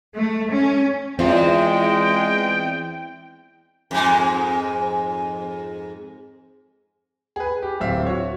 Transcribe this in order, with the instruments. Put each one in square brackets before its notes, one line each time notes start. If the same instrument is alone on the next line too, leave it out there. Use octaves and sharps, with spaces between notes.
[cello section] A3
C#4
[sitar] E2 [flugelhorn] G#3 [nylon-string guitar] C4 F4 [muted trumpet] G5
[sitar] F2 G#2 G#3
[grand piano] G#4 B4
G4
D1 C4 E5 F5
F#4 C#5